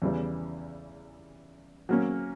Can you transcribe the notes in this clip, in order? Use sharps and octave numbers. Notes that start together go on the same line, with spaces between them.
E2 C#3 E3 G3
F#3 A#3 C#4